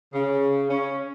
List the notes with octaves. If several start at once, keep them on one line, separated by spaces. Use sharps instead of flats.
C#3
C#4